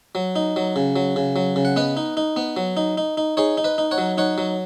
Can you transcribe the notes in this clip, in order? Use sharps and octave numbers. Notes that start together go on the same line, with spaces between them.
F#3
D#4
F#3
C#3
F#3
C#3
F#3
C#3
F#5
B3 B4 D#5
D#4
D#4
B3
F#3
D#4
D#4
D#4
D#4 G#4 C#5
D#4
B4 D#5
D#4
C#5 F#5
F#3
D#4 C#5 F#5
F#3